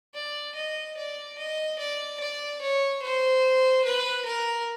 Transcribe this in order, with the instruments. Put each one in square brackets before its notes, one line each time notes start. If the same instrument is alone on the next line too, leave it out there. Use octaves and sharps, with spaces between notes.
[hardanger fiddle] D5
D#5
D5
D#5
D5
D5
C#5
C5
B4
A#4